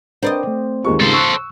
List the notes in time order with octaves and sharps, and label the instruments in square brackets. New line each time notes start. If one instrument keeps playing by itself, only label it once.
[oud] C4 D5 D#5 [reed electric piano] D4 A#4 B4
[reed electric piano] A3
[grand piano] D#2 G#3 C#6 [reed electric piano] F4 G4 A#4
[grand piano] G#2 C#3 [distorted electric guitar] A4 C5
[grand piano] C#6 [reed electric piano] E6 F#6